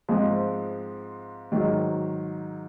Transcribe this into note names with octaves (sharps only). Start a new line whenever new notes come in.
G#2 F3 G#3 C4
G#2 D#3 F#3